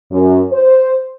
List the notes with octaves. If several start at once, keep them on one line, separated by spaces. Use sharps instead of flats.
F#2
C5